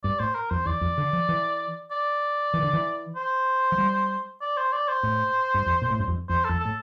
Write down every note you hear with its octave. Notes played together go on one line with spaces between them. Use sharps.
G2 D5
A2 C5
A#4
F2 C5
E2 D5
F2
D3
F3
E3
D5
E3
D3
E3
C5
F3
G3
D5
C5
D5
C5
A2
G2
F2
A#2
A2
G2
F2
F2 C5
F2 A4
A4
A2